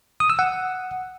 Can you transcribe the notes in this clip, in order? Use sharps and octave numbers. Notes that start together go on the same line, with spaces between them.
D#6
E6
F#5